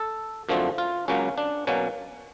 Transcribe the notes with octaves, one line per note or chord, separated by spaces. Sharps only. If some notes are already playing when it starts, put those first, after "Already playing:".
Already playing: A4
F#2 D3 F3 A3 C4
F4
C#2 C#3 F#3 A#3 C#4
D4
B2 F#3 A#3 C#4